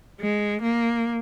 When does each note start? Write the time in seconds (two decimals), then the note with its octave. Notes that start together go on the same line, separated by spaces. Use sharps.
0.21 G#3
0.62 A#3